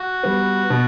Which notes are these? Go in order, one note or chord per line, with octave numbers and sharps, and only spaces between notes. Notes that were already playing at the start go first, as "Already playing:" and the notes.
Already playing: F#4
G3 B3
B2